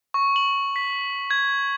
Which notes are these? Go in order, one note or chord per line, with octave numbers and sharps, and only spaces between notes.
C#6
F#7
B6
G#6